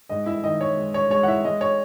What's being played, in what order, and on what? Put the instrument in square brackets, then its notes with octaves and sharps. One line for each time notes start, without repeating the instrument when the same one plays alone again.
[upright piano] G#2 D#5
E4 E5
D#3 D#5
C#5
G#3
C#5
G#3 C#5
F#5
E4 E5
G#3 D#5
C#5